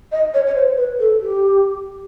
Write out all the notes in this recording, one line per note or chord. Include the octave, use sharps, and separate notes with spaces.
D#5
C#5
C#5
C5
B4
A4
G4